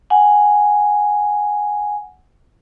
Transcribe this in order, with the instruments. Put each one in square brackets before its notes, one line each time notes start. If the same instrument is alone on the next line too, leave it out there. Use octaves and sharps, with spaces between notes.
[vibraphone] F#5 G#5